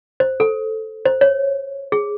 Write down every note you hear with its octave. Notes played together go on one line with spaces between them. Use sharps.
C5
A4
C5
C#5
G#4